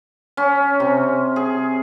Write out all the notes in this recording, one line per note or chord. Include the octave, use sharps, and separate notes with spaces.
C#4
C3
G#4